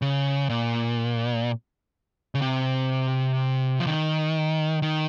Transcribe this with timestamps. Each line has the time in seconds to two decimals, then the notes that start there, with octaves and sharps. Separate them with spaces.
0.02 C#3
0.49 A#2
2.35 C#3
2.42 C3
3.80 F3
3.86 D#3
4.82 D#3